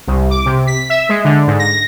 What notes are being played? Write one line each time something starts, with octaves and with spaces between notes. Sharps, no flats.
C2
D6
C3
B6
E5
G#3
D3
G#2
A#6